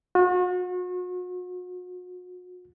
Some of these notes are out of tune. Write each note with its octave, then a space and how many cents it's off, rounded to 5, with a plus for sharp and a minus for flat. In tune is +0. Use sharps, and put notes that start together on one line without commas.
F#4 -40